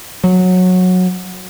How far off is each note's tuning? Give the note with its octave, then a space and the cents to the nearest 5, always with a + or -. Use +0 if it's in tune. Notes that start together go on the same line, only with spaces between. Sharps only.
F#3 -15